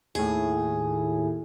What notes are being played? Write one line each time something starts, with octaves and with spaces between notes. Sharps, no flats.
D#2 A2 G#4